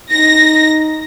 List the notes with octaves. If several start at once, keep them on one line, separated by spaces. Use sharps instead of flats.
D#4 A#6